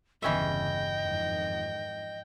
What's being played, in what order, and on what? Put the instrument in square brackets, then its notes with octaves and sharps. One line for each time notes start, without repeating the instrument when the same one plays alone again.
[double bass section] G1 E2 C#3 [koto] E3 C#4 E5 [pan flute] D#5 [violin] G5
[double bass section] F2 G#2 D#3